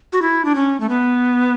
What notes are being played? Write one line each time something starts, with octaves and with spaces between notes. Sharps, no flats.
F#4
E4
D4
C#4
A3
B3